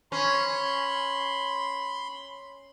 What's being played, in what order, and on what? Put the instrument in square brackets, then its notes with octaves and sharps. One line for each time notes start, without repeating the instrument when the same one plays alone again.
[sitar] C#4 [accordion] B5 C6